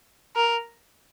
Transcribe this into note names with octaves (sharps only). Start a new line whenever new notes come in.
A#4